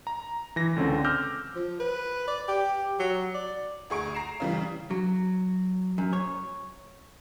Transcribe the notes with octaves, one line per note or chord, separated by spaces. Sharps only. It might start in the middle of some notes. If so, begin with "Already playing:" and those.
A#5
E3 A#6
C#2 D3 C4 C#4
D6 E6 F6 G6 A#6
F3
B4
D5
G4
F#3
D5
D2 G#4 C#6 D7
A#5 C7 E7
C#3 E3 G3
F#3
F#2
C#5